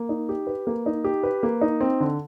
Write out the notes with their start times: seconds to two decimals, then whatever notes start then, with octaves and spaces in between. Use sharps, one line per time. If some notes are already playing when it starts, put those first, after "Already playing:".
Already playing: A#3
0.09 D#4
0.29 G4
0.47 B4
0.67 A#3
0.86 D#4
1.04 G4
1.23 B4
1.43 A#3
1.61 D#4
1.81 C4
2.00 D3